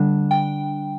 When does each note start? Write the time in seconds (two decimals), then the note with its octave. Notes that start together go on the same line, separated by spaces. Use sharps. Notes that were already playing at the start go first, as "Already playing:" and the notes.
Already playing: D3 G3 D4
0.31 G5